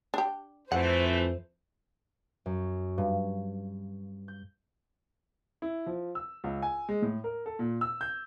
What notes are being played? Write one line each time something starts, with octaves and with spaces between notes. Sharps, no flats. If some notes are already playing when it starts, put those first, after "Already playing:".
D4 G4
F2 E3 A3 C5 F#5
F#2
G2
G6
E4
F3
E6
C#2
G#5
G#3
A2
A#4
A4
A#2
E6
G6